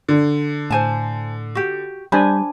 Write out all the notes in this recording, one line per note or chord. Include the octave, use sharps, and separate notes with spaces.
D3
A2 C5 G#5 A5
F#4 G4
G3 D4 C5 G#5 B5